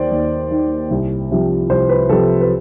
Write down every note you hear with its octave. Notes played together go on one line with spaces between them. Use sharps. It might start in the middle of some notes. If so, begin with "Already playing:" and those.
Already playing: D#2 D#3 C5 D5
D#2
D#3
C2
C3 F3
C2 C5
B4
C3 F3 A4
B4